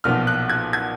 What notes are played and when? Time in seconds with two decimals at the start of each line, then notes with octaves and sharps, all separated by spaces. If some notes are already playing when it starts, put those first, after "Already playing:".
0.04 B1 A#2 F3 B3 F6
0.27 F#6
0.49 G#6
0.73 G#6